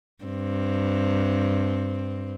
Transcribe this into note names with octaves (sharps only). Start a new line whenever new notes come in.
G2 C4